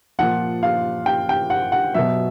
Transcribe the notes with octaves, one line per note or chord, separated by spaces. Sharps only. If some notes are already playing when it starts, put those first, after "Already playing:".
A#2 F3 F#5
F5
G5
G5
F#5
F#5
B2 F#3 E5